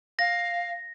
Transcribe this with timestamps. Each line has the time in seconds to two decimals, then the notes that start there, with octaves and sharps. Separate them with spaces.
0.19 F5 A#6